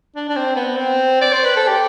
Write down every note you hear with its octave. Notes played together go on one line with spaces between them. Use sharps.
D4
D4
C4
B3
C4
D5
C5
B4
A4
G4